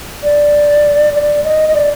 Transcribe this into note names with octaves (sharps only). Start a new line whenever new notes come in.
D5
D5
D#5
D#5
D5